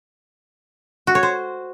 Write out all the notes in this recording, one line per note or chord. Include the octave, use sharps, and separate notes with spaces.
F#4
C#5
C5